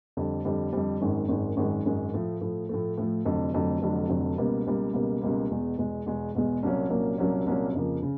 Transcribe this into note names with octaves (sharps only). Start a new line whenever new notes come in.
F2 D3 G3
F2 D3 G3
F2 D3 G3
G#1 F#2 D#3 G#3
G#1 F#2 D#3 G#3
G#1 F#2 D#3 G#3
G#1 F#2 D#3 G#3
A2 F3 A3
A2 F3 A3
A2 F3 A3
A2 F3 A3
F1 F2 D3 F#3
F1 F2 D3 F#3
F1 F2 D3 F#3
F1 F2 D3 F#3
C#2 B2 G3 A#3
C#2 B2 G3 A#3
C#2 B2 G3 A#3
C#2 B2 G3 A#3
E2 B2 G#3
E2 B2 G#3
E2 B2 G#3
E2 B2 G#3
C2 A#2 F#3 A#3 C#4
C2 A#2 F#3 A#3 C#4
C2 A#2 F#3 A#3 C#4
C2 A#2 F#3 A#3 C#4
F2 C#3 F3 A#3
C#3